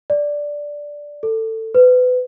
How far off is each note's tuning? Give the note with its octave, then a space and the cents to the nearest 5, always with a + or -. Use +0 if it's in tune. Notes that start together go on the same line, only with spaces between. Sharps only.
D5 -5
A4 +20
B4 +30